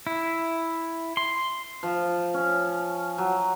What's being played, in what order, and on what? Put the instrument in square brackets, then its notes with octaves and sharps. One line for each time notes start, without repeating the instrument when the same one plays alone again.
[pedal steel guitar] E4
C6
[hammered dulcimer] F3
C#4
F#3